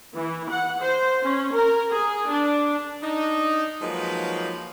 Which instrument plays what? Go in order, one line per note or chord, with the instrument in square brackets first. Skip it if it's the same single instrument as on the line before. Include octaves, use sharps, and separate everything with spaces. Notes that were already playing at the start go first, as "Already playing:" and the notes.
[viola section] E3
F#5
C5
C#4
A#4
G#4
D4
[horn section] D4 D#4
F3 F#3 G#3 A#3 D#4 B4